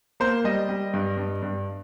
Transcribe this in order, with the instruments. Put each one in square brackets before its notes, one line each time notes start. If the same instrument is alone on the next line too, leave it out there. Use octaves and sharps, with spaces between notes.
[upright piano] A#3 [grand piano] C5
[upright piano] G3 [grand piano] D#5
[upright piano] G3
G2
G2
G2